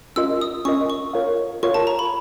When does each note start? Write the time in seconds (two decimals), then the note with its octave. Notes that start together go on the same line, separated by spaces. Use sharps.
0.16 C#4 F4 A#4 D#5 E6
0.41 D#6
0.65 C#4 F4 A#4 D#5 C#6
0.90 C#6
1.14 F4 A#4 C#5 F5
1.63 F4 A#4 C#5 F5 C#6
1.74 A5
1.87 A#5
1.99 B5